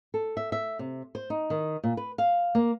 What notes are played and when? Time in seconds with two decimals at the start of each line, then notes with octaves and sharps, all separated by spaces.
0.14 A4
0.37 E5
0.52 E5
0.79 C3
1.15 C5
1.30 D#4
1.50 D#3
1.84 A#2
1.97 B4
2.18 F5
2.55 A#3